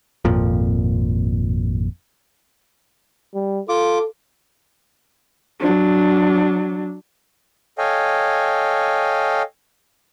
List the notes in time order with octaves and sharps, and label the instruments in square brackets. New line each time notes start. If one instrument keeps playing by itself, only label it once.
[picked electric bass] G#1 F2 A#2 F3
[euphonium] G3
[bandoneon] F4 D6 [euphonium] A4
[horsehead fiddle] F#3 D4
[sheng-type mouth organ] A4 C#5 D#5 F5 G5 G#5